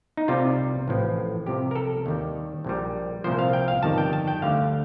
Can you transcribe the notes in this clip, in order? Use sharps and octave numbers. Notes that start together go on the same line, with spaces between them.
D#4
C2 C3 G3 F4
A1 A2 F3
C2 C3 F3 G4
A#4
A4
D#2 D#3 G3
A#1 A#2 G3
C2 A#2 F3 C5
F5
G5
F5
G1 F2 D#3 G3 A5
G5
A5
G5
D2 D3 G3 F5